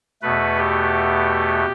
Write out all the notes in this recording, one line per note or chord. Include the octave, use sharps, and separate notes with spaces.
E2 B2 A3 B4
G4